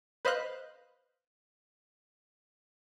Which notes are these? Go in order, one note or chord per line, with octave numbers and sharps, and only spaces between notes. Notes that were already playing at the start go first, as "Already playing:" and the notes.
B4 C5 D#5 F5 F#6